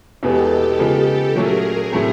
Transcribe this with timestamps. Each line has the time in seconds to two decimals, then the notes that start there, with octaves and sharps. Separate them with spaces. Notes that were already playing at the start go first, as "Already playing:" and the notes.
0.23 E2 B2 G#3 B3 G4 A4
0.79 C#3 F3 G#3 B3
1.35 A#2 F#3 A3 C#4 G#4 A#4
1.92 A2 F#3 A3 C4